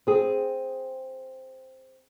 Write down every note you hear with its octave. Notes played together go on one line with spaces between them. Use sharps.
C4 G#4